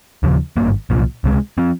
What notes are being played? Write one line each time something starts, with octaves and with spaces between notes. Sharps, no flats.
D#2 C#3 F3
G#1 G2 D#3 A#3
C2 A#2 F3
C#2 C3 F3 G#3
F3 C4